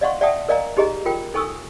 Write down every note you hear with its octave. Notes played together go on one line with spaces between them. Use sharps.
D5 D#5 F5 F#5 C6 C#6
D5 E5 F#5 G5 A5 D#6
A#4 D5 D#5 F5 G#5 A#5
D#4 G4 G#4 D#5 A#5
F4 A#4 G5
D#4 A4 G#5 C#6 D#6 E6